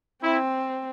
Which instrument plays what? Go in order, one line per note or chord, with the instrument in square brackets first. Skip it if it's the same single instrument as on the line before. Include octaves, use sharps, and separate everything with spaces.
[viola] C4 [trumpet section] E4